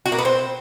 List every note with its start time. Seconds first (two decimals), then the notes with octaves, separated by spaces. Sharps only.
0.06 F#4
0.12 A#3
0.19 B3
0.25 C4